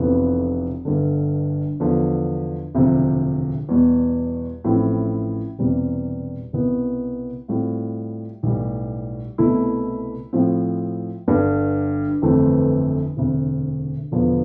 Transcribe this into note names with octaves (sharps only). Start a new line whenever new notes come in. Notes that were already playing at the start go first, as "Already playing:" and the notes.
Already playing: F1 F2 E3 B3 F4
G1 G2 D3
E2 D3 F3
E1 D2 C3 F3
E2 B2 G3
A1 A2 F3 C4 E4
E1 E2 C3 G3
C2 B2 B3
A2 G3 C4 F4
B1 A2 G3
C2 B2 A3 E4
A2 F3 C4
G1 G2 D3 G3
G1 F2 E3 A3 C4
E1 D2 C3
E1 E2 D3 F3 B3